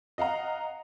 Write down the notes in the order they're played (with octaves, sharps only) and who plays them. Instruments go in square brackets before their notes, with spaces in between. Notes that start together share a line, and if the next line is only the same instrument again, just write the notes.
[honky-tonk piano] D#5 F5 F#5 A#5